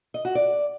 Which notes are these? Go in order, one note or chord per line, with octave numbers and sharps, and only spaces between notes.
D#5
F#4
D5